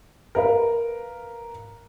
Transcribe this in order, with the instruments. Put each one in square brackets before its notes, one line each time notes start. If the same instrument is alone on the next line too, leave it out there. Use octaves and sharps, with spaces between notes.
[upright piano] A#4 B4 F5